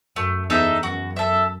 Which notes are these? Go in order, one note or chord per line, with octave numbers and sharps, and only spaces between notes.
F#2 A3
E2 D#4 A4 E5
F#2 F#4
A4 E5